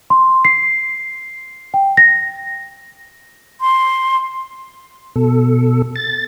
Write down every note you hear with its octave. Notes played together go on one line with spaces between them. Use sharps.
C6
C7
G5
A#6
C6
B2 A4
A6